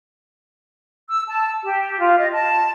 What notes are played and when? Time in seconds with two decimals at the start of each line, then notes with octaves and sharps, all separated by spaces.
1.09 E6
1.29 A5
1.63 G4
1.99 F4
2.18 D#5
2.32 A5